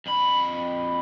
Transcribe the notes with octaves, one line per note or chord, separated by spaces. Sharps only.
F2 B5